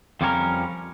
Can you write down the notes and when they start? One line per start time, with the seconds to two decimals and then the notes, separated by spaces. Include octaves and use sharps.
0.21 F2 F3 G3 C#4 A4 A#4